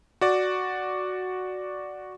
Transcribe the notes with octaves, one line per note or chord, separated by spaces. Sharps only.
F#4 D5